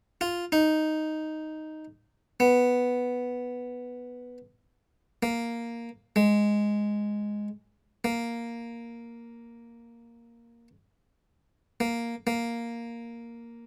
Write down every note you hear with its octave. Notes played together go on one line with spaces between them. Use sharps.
F4
D#4
B3
A#3
G#3
A#3
A#3
A#3